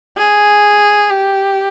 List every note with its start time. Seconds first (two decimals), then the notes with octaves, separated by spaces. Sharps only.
0.17 G#4
1.09 G4